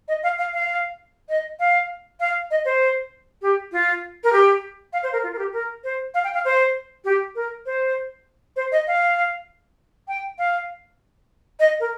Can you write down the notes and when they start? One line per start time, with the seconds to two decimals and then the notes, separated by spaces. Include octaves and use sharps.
0.08 D#5
0.23 F5
0.38 F5
0.54 F5
1.29 D#5
1.60 F5
2.20 F5
2.51 D#5
2.65 C5
3.42 G4
3.72 F4
4.24 A#4
4.33 G4
4.93 F5
5.03 C5
5.13 A#4
5.24 F4
5.33 A#4
5.39 G4
5.53 A#4
5.84 C5
6.14 F5
6.24 G5
6.34 F5
6.45 C5
7.05 G4
7.35 A#4
7.66 C5
8.56 C5
8.72 D#5
8.87 F5
10.08 G5
10.39 F5
11.60 D#5
11.80 A#4